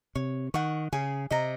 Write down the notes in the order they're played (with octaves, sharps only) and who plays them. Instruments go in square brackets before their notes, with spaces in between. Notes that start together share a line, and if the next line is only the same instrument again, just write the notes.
[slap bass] C3 [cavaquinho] C#5
[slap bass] D#3 [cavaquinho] F#5 C#6
[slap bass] C#3 [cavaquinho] G#4
[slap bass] C3 [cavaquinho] D#5 A#5